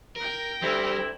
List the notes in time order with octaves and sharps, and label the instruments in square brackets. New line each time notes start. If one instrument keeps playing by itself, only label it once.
[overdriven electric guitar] A#4 [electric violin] G5 A#6
[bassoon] D2 [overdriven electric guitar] G3 [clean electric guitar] C4 E4